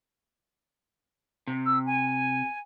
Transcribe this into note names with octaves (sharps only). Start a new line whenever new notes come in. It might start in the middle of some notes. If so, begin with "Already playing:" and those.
C3
E6
G#5